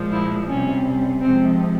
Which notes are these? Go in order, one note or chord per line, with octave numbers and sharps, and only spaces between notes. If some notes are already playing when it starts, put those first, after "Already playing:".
Already playing: A#2 F3 G#3
E4
C3 G3 C#4
C3 F3 G#3 C4